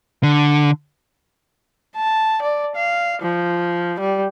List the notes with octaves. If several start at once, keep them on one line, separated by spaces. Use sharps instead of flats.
D3
A5
D5
F5
F3
G3